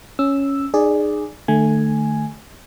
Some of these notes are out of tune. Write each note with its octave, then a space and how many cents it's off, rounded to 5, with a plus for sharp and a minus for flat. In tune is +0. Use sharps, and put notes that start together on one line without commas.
C#4 +0 E6 +0
D#4 -35 G#4 +0 D5 +0
D3 +40 A3 +0 G#5 +0